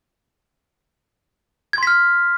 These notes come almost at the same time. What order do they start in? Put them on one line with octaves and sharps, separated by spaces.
G#6 C6 B6 F6